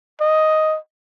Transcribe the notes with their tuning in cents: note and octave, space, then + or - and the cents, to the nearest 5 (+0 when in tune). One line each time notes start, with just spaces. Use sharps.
D#5 +5